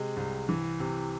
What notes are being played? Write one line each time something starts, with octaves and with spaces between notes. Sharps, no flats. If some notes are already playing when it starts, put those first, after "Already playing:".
Already playing: C3 G#3
C2
E3
C3